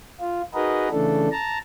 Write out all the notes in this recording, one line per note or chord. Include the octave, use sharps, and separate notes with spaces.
F4
D#4 F#4 G#4 A#4 B4 D#5
C#3 E3 A3 D4 A4
A5 A#5